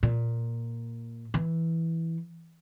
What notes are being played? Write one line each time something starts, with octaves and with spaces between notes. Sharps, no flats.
A#2
E3